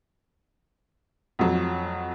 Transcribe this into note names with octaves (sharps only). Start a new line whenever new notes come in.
F2 F#3